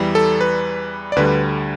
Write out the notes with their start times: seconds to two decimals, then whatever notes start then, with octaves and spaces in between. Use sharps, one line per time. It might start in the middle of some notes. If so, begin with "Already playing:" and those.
Already playing: E2 E3 G3
0.15 A4
0.41 B4
1.12 D5
1.16 D2 D3 G3 B4